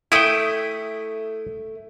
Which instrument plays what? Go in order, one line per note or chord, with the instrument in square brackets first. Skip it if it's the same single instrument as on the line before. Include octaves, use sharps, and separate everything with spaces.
[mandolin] A3 D#6 [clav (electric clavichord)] E4 G5